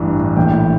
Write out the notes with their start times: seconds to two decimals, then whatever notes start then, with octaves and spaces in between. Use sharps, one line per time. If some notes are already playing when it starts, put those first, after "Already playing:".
Already playing: A1 G2 E3
0.37 A#1 A2 E3 G5